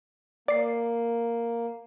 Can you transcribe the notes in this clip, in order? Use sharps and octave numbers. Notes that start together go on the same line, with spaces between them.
A#3 D5 C7